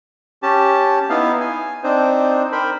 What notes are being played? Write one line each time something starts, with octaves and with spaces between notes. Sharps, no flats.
C#4 G4 A5
B3 D#4 E4 F5
G#5
C4 D4 D#4 C5
A#4 C5 G5 B5